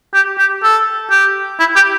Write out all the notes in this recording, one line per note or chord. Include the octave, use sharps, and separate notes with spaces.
G4
G4
A4
G4
E4
G4